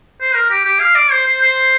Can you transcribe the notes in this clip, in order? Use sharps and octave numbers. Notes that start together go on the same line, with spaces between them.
C5
A#4
G4
G4
F5
D5
C5
C5
C5